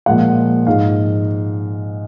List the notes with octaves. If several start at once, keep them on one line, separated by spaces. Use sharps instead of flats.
A#2 F3 G#3 F#5
G#2 F3 G#3 F5